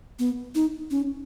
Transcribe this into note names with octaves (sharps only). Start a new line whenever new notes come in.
B3
D#4
C#4